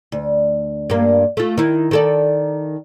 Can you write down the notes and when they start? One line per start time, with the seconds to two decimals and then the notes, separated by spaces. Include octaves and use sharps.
0.12 D2
0.90 G2 A#3
1.37 A3 F4
1.58 D#3 E4
1.91 D#3 A4 D5